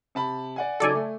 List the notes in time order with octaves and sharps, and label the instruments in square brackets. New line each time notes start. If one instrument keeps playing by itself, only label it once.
[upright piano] C3 A5 B5
D5 F#5 G#5
[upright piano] C#3 F#3 D#4 [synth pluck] A4 D5 G#5
[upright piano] A3